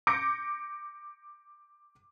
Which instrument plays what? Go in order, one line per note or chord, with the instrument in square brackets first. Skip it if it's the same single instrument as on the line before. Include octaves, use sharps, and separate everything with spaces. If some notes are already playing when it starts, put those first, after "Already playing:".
[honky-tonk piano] D6 G6 A#6 C#7 D7